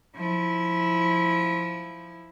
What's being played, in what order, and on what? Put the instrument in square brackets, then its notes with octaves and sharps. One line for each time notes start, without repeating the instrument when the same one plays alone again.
[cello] F3 E4